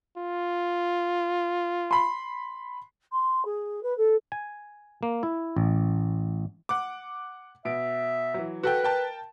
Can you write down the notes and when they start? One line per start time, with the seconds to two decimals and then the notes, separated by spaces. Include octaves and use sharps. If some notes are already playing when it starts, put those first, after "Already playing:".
0.17 F4
1.91 B5 C6
3.12 C6
3.45 G#4
3.83 B4
3.98 A4
4.32 G#5
5.03 A#3
5.23 E4
5.56 A1
6.69 F#5 D6
7.65 B2 E5 D7
8.34 E3 F#3
8.63 F#4 A4 B4 G5
8.83 A#4 G5 A5